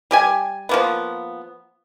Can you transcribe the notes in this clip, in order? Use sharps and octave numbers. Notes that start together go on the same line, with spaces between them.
G3 G4 G#5
F3 A#3 B3